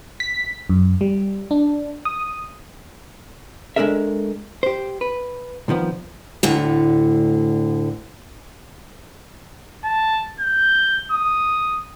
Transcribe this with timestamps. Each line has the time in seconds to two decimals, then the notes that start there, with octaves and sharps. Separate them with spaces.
0.20 B6
0.70 F#2
1.01 G3
1.51 D4
2.05 D#6
3.76 G#3 A3 D4 A4 A#4 E5
4.63 G4 C5
5.01 B4
5.68 C2 D#3 F3 B3
6.43 D2 A2 D3
9.85 A5
10.40 G6
11.12 D#6